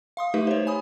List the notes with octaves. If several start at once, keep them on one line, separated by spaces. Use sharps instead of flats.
F5 C6 D#6
A3 D#4 G4 B4 E5
C5 C#5
G#5 B5 D#6